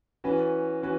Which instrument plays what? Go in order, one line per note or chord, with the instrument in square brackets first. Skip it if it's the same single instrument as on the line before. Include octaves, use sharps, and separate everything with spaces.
[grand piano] E3 C#4 F#4 B4
E3 C#4 F#4 B4